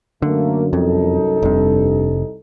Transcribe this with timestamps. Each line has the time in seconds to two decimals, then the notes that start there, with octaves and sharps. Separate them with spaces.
0.22 F#2 D3 A3 A#3
0.73 C2 F2 D#4 A4
1.42 F1 G2 C3